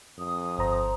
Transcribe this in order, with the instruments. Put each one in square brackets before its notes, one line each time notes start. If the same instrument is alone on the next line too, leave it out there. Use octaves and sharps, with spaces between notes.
[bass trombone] F2 [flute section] D#6
[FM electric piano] G1 A#5 [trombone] C5